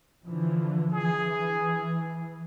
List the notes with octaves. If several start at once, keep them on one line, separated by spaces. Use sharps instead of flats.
D3 E3 F3
E3 G#4